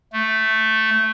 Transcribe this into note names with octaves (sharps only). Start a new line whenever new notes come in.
A3